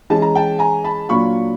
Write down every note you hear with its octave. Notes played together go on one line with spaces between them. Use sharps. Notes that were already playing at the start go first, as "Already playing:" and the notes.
E3 G#3 C#4 A5
A#5
G5 A5
G#5 A#5
A5 B5
A#2 F#3 A#3 D4 F4 B5 C#6